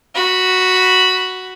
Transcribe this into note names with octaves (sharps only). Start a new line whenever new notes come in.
F#4 B5